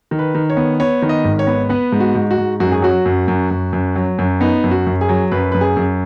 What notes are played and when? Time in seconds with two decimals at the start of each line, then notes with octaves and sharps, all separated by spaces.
0.11 D#3
0.19 B4
0.35 D#3
0.50 C#5
0.57 B3
0.80 B3 C#5
1.02 D#3
1.09 D#5
1.25 G#1
1.39 C#5
1.47 B3
1.69 B3 B4
1.92 G#2
2.00 F#4
2.15 G#2
2.31 F#4
2.38 G#2
2.60 F#2 F#4
2.72 G#4
2.82 F#3 F#4
3.06 F#2
3.28 F#2
3.51 F#2
3.73 F#2
3.96 F#3
4.18 F#2
4.41 B3 D#4
4.64 F#2
4.71 F#4
4.87 F#2
5.01 G#4
5.09 F#3
5.31 F#2 B4
5.52 F#2 B4
5.61 G#4
5.76 F#2